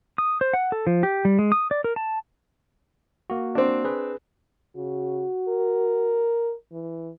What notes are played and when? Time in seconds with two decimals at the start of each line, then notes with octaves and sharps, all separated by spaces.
0.18 D#6
0.41 C5
0.54 F#5
0.72 A4
0.87 F3
1.03 G4
1.25 G3
1.39 G#3
1.52 D#6
1.71 D5
1.84 A#4
1.96 A5
3.30 A#3 F#4
3.55 C4 D4
3.84 G#4 B4
4.76 C#3 F#4
5.49 A#4
6.72 E3